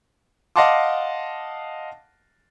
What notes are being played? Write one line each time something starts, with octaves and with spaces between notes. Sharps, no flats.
D#5 F5 F#5 A5 C6 D6